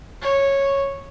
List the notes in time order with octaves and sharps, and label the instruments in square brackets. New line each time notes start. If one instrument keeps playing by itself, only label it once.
[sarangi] C#5